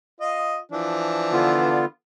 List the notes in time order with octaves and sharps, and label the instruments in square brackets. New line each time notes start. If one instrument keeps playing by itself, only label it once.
[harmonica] F4 D#5
E3 F3 D4
[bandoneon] D3 B3 F4